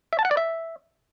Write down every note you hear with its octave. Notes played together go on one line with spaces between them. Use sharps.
E5
A5
F#5
D5
E5